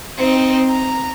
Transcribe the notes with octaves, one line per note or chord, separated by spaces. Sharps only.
C4 D#4
A#5